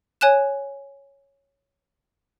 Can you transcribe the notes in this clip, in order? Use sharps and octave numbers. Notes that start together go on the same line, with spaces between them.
C#5 G#5 F#6 E7